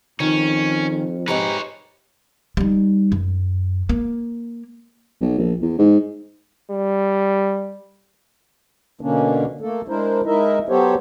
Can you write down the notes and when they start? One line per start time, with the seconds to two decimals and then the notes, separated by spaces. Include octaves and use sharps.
0.20 F2 D#3 C#4
1.28 G#2 G4 B4 C#5 A#5
2.57 G3 D#4
3.12 F#2
3.89 A#3
5.21 B1
5.38 A#1
5.62 E2
5.78 G#2
6.70 G3
9.01 B2 D3 A#3 C#4 D4
9.61 A3 A#3 A4
9.88 G#3 D4 E4 A#4 C5
10.26 G#3 D#4 E4 A#4 D#5 E5
10.69 F#3 B3 G4 A4 C5 C#5